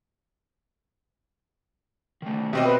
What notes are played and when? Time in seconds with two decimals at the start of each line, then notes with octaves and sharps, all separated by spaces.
2.22 D#3 A3
2.53 B2 C4 G4 C#5 D#5 E5
2.65 B4